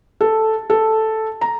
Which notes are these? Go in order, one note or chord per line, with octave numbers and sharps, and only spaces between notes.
A4
A4
A#5